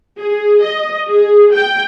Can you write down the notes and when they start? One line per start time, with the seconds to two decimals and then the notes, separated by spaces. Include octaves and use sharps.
0.19 G#4
0.62 D#5
1.11 G#4
1.54 G5